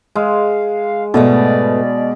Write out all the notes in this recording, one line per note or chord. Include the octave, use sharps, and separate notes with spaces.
G#3 F5
G#2 B2 A3 B3 D5